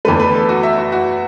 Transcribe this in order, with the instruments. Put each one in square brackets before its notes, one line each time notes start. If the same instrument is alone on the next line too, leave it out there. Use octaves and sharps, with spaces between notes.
[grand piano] E2 D3 A3 B4
B4
A4
F#4
E5
F#4
F#4